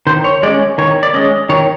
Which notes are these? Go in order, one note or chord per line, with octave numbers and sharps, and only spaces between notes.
D#3 C5
C#5
G#3 C#4 D5
D#3 C#5
D5
G#3 C#4 D#5
D#3 C#5